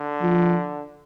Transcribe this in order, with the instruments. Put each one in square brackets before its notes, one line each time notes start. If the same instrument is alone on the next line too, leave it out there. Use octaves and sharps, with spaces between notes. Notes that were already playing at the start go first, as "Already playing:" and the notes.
Already playing: [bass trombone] D3
[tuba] F3